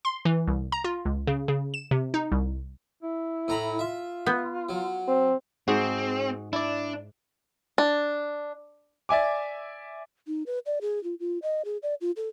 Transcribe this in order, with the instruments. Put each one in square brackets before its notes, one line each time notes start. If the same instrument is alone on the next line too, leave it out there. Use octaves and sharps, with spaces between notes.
[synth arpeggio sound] C6
E3
C2
A#5
F4
C#2
C#3
C#3
E7
C3
D#4
C2
[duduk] E4
[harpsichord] A2 A#5 B5
[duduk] F4 [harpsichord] E5
[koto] B3
[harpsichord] F#3
[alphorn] C4
[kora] G#2 [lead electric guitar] C4 [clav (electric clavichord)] F#4 G#4 F#5
[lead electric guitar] D4 [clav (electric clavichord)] E4 D5
[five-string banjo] D4
[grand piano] D5 E5 G#5 D6
[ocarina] D#4
B4
D5
G#4
F4
F4
D#5
G#4
D5
F4
A4